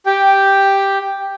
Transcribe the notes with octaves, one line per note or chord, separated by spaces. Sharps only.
G4 G5